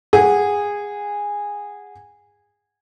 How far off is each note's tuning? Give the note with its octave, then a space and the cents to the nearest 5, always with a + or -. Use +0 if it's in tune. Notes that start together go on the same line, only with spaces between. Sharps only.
G#4 -15 F#5 -10